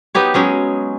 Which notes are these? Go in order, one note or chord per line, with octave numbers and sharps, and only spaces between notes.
B3 D#4 G4 C#5
F#3 G#3 C#4